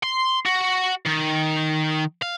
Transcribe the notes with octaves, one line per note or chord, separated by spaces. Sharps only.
C6
F#4
D#3
F5